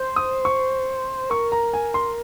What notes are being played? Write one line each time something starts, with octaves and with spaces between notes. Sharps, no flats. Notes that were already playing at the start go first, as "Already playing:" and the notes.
Already playing: C5
D#6
C#6
A#4 C#6
A#5
G#5
C6